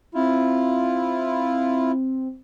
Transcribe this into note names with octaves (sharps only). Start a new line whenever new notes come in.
C4 E4 F4